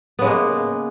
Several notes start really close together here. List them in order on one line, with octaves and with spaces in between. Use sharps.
B3 C#3 G#3 A#3